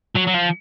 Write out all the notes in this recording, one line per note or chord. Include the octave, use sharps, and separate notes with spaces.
F#3
F#3
F3